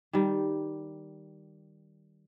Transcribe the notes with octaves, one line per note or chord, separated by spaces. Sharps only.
D#3 G3